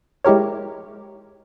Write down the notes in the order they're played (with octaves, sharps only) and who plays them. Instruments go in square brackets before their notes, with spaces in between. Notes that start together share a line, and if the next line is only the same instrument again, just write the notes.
[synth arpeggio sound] G#3 E4 G4 A#4 C#5